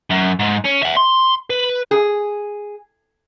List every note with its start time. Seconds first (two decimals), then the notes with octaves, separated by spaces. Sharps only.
0.10 F#2
0.39 G#2
0.64 C#4
0.83 E5 F#5
0.96 C6
1.50 B4
1.91 G#4